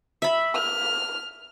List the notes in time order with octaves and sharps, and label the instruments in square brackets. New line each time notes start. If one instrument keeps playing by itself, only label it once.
[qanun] E5 B5
[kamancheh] F6